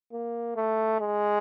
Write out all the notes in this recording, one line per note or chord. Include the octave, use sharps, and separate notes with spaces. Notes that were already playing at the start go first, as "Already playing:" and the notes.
A#3
A3
G#3